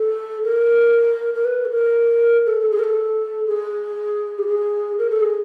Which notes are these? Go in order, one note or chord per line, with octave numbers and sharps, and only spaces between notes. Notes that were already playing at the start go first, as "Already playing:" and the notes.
Already playing: A4
A#4
A#4
B4
A4
A#4
A4
A4
G#4
A#4
A4
G#4
G4
G#4
A#4
A4
G#4